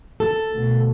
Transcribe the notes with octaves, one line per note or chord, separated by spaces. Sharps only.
A4
D2 B2